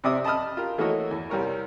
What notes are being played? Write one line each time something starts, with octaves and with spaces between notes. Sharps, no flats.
C3 C4 D5 E5 D#6
D#5 A5 B5 D#6 F6
F4 G4 A#4
E3 A3 A#3 F#4 C#5 D#5
E2
C2 G3 A#4 C#5